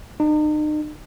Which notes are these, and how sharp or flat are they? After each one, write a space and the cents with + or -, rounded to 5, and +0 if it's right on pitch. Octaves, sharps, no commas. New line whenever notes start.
D#4 -40